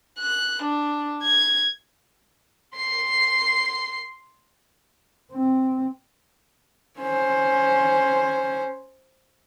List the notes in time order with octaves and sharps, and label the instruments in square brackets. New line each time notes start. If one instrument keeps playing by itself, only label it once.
[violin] F#6
D4
G#6
C6 C7
[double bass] C4
[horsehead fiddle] C#4 C5